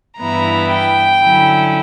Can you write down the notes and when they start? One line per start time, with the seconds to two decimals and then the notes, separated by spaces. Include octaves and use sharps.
0.18 G2 E3 B3 E4 A#5
0.70 G5
1.22 D3 F#3 C#4 E4